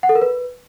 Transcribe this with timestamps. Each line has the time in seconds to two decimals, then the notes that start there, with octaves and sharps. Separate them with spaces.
0.03 F#5
0.09 A4
0.15 A#4
0.22 B4